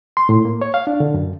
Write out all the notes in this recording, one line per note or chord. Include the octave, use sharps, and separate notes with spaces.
C6
A2
A#3
C#5
F5
D4
D3
F#2